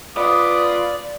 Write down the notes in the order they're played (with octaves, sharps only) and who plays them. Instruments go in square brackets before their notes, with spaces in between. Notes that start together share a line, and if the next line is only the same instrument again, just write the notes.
[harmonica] F4 B4 D#6 [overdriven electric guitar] D5